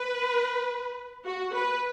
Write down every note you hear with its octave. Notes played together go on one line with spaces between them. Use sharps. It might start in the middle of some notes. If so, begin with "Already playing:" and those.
Already playing: B4
F#4
B4